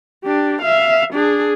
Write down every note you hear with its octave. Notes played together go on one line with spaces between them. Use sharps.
D4 G4
E5 F5
D4 G#4